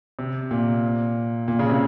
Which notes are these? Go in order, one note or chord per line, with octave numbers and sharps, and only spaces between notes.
C3
A#2
A#2
C#3
C3